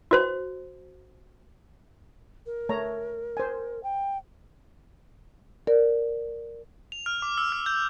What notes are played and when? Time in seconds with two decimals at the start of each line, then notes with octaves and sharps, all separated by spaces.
0.11 E4 F#4 B4 C5
2.46 A#4
2.69 A3 C#5 A#5
3.37 C5 G#5
3.83 G5
5.67 A#4 D5
6.92 F7
7.06 F6
7.22 D6
7.38 E6
7.52 F6
7.66 G6